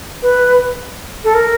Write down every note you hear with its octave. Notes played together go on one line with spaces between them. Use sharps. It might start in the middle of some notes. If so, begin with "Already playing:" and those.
B4
A4
A#4